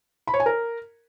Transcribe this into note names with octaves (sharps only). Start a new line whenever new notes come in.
B5
C#5
G#5
A#4